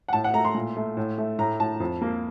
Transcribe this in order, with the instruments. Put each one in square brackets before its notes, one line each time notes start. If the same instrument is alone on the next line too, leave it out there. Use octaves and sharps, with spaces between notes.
[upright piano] F#5
A2 A5
F#5
A3 A#5
C6
A#2
A3
A2
A3
A2 A#5
A2 A5
F2
A#3